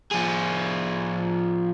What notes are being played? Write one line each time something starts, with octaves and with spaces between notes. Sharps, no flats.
F3 G#4